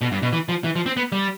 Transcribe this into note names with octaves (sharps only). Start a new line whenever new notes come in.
B2
G2
B2
E3
F3
E3
F3
C4
B3
G3